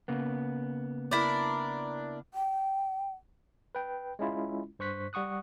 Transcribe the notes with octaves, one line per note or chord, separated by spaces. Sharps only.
C#3 A#3 B3
D4 E4 A#4
G5
B4 G5
G#3 C#4 E4 F4
G2 C5 C#6 F#6 B6
G3 F#5 C#6 D#6 F#6